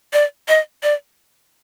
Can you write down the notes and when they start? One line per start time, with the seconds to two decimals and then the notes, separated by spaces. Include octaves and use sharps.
0.13 D5
0.48 D#5
0.83 D5